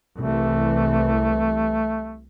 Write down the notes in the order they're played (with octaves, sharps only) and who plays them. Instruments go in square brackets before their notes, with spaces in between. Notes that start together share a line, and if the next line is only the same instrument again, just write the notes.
[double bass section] C2 C3 E3 [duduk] A3